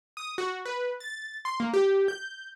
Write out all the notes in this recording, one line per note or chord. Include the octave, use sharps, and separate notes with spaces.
D#6
F#4
B4
A6
C6
A#3
G4
G6